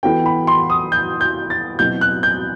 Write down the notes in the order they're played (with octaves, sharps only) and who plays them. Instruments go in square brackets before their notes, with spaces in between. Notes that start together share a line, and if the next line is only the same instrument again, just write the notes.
[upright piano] E3 B3 F#4 A4 [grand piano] G5
[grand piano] B5
C6
D#6
G6
G6
A6
[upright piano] B2 F#3 C4 E4 [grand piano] G6
[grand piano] F#6
G6